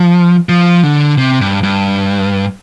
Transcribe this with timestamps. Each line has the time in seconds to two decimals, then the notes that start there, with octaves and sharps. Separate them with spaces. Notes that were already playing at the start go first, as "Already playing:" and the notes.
Already playing: F3
0.49 F3
0.83 D3
1.18 C3
1.41 G2
1.63 G2